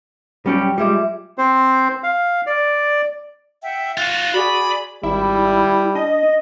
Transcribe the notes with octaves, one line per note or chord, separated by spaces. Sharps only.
F#3 G3 C#4 G4 G5
G3 G#3 F4 E5 D6
C4 C5
F5
D5
E5 F#5 G5
F4 F#4 F#6
F#4 G#4 D5 B5
G#1 G3 E4
D4 D#5